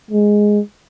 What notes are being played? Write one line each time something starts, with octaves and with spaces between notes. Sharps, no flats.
G#3